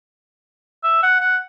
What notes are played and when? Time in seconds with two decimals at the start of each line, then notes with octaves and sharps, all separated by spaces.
0.84 E5
1.03 F#5
1.20 F#5